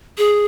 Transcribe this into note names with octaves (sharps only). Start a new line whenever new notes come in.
G#4